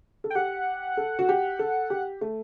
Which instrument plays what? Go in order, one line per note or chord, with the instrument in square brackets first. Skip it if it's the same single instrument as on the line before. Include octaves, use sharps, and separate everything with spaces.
[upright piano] A4
[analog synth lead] G5
[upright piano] G4 [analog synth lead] F#5
[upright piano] A4
F#4
G4
A4
G4
A3